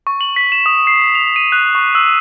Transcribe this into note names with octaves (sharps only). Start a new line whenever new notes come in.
C#6
F#7
B6
E7
D#6
C7
F7
D#7
F#6
C#6
E6